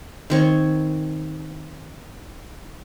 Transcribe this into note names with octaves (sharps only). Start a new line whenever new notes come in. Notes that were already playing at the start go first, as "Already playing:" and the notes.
D#3 C4 C#5